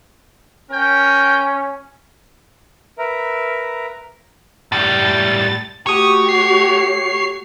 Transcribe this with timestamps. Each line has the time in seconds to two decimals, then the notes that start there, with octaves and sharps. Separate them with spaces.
0.71 C#4 A#4 G5
2.98 A#4 B4 E5 A#5
4.72 A2 G3 A6
5.87 A3 F#4 G4 C#5 C#6 D#6
6.29 C7